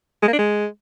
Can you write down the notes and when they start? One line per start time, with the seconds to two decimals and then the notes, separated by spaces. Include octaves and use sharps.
0.23 G#3
0.28 A#3
0.33 D4
0.39 G#3